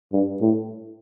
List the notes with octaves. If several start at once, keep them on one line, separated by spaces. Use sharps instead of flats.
G2
A2